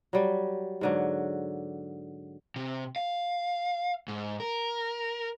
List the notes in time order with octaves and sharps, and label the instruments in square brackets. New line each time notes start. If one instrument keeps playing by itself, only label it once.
[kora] F#3 G3
G#2 D3 F#3
[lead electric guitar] C3
F5
G#2
A#4